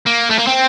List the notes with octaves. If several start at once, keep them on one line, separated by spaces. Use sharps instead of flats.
A#3
A3
A#3
C4